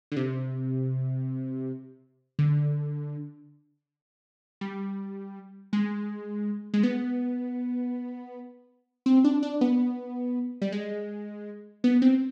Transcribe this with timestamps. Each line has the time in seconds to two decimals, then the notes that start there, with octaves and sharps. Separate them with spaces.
0.12 D3
0.16 C3
2.39 D3
4.61 G3
5.73 G#3
6.74 G#3
6.83 B3
9.06 C4
9.24 D4
9.43 D4
9.61 B3
10.62 G3
10.72 G#3
11.84 B3
12.02 C4